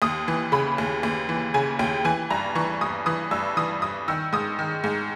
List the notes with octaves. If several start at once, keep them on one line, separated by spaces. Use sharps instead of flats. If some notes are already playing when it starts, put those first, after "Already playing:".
D#2 D#6
E3
C#3 B5
D#2
D#2
E3
C#3 G#5
D#2 G5
E3 G#5
G2 A#5
E3 C#6
G2 D#6
E3 D#6
G2 E6
E3 D#6
G2 D#6
D#3 E6
G#2 D#6
D#3
G#2